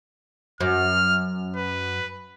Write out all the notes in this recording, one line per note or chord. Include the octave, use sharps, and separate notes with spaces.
F#2 F6
B4